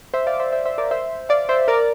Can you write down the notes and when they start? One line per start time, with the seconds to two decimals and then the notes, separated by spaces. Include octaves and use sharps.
0.14 C5 E5
0.27 D5 F5
0.40 C5 E5
0.52 C5 E5
0.65 C5 E5
0.78 A#4 D5
0.91 C5 E5
1.29 D5 F5
1.49 C5 E5
1.68 A#4 D5